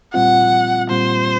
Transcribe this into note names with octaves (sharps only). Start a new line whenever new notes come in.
A#2 G3 C4 F4 F#5
A#2 G3 C4 F4 C5